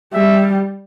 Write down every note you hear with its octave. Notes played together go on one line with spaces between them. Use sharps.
G3 E5